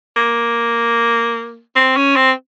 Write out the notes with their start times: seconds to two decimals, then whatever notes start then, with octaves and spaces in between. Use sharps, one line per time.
0.16 A#3
1.76 C4
1.97 C#4
2.16 C4